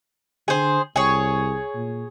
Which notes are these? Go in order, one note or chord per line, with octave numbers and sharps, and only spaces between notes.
D3 G#4 C5
C2 G#4 C#5
A#2